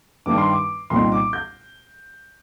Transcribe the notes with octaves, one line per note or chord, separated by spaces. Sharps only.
G2 D#3 G3 D4 D6
C6
D6
C2 A#2 G3 C4 D#4 C6
D6
G6